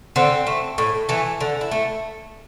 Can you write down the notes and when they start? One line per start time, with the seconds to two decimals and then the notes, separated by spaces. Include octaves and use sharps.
0.16 D3 C4
0.47 A3
0.78 A2
1.09 E3 A3
1.40 D3
1.61 E4
1.71 A3